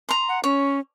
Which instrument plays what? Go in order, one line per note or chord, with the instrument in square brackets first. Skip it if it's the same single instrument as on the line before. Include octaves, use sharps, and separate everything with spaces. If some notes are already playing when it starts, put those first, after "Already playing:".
[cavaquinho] A#5 C6
[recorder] F#5
[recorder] C#4 [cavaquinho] C#5